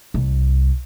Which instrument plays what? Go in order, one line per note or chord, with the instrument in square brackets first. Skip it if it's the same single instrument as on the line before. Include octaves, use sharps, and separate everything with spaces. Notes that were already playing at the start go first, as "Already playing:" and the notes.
[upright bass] C2